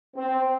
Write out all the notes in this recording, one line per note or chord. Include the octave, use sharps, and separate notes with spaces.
C4